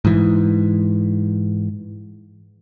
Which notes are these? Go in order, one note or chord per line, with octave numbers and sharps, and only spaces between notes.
G#2 E3